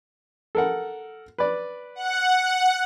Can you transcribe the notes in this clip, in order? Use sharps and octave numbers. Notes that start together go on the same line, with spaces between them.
A4 A#4 F#5
B4 D5
F#5